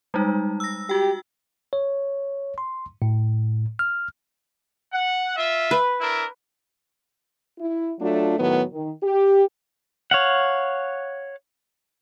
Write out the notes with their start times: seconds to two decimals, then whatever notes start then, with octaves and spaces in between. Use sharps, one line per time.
0.14 G3 G#3 D#4
0.60 E6 A#6
0.89 F#4 G4 G5
1.73 C#5
2.58 C6
3.02 A2
3.79 F6
4.92 F#5
5.36 F4 E5
5.71 B4
6.00 D4 E4 A#4
7.59 E4
8.00 F#3 A3 D4 F4
8.39 A2 D#3 F#3 B3
8.73 D#3
9.03 G4
10.11 C#5 F5 F#5